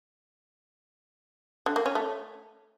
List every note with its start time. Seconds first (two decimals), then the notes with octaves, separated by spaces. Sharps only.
1.66 D3
1.76 A#3
1.86 C#4
1.95 A3